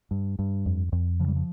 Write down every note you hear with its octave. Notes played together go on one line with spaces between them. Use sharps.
G2
G2
F2
F2
C#3 F3
G3
F3